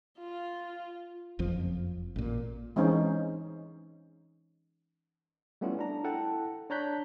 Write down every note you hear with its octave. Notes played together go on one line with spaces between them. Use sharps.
F4
F#1 F2 F3
A1 A#2
E3 G#3 C4 C#4 D#4 C5
G3 A3 B3 C#4 E4 F4
D4 A#5
E4 A4 F#5 G5 A5
D4 C#5 A#5 F#6 G6 B6